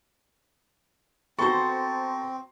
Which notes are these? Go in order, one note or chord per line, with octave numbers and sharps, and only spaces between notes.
B3 C4 F#4 A4 C5 A#5 C6 C#6